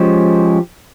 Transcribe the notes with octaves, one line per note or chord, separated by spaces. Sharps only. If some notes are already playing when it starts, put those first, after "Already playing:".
Already playing: F3 G#3 C#4 G4 C5